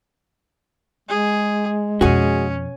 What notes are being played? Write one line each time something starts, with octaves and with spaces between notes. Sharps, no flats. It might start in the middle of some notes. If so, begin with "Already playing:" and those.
G#3 G#4
F2 B2 C#4 F#4 G#4